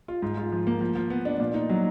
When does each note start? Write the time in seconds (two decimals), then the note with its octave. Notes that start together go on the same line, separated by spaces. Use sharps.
0.08 F4
0.22 G#2
0.37 F4
0.52 F3
0.67 A#3
0.81 F3
0.95 F3
1.10 B3
1.25 D4
1.40 A#2
1.54 D#4
1.69 F#3